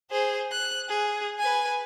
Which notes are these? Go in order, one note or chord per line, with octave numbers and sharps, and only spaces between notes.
G#4 C5
F#6
G#4
B4 G#5